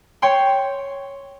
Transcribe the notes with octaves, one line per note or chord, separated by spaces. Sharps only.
C#5 G5 C6